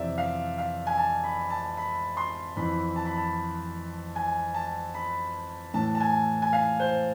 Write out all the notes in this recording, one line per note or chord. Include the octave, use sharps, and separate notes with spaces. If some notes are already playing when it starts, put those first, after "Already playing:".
Already playing: F2 C3 E3 D5 E5
F5
F5
G#5
A5
B5
A5
B5
C6
F2 E3 B5
A5
B5
A5
G#5
A5
B5
A2 E3 A5
A5
G#5
G#5
F5
C5